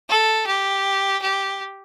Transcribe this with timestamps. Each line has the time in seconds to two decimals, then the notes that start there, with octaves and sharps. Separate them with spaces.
0.09 A4
0.46 G4
1.22 G4